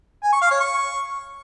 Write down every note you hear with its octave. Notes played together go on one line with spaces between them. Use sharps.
G#5
C#6
F5
C#5
C#6